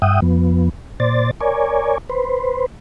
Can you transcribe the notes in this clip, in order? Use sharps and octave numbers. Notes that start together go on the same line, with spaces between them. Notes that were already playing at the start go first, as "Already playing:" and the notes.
G2 E5 F#5 G5 D#6
F2 F3 B3
A#2 C5 D5 A6
A#4 C#5 D5 G#5
B4 C5